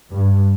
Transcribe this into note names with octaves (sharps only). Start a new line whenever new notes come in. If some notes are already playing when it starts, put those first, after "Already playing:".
G2